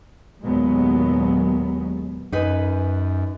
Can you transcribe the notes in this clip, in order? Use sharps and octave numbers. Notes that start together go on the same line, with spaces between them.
D#2 A#2 F#3 G#3 B3
F#2 D#4 B4 G#5